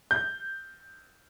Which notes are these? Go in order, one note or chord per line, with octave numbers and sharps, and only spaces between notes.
G6